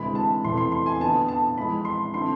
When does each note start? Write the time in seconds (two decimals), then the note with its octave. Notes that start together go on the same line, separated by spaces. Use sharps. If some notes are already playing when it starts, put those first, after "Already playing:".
Already playing: D2 C3 E3 G#3 B5
0.15 A5
0.44 E2 C3 E3 A3 C6
0.57 C6
0.72 C6
0.86 G#5
1.00 F2 D3 F3 B3 A5
1.28 A5
1.57 F2 E3 G#3 B5
1.85 C6
2.14 D3 A3 C4 C6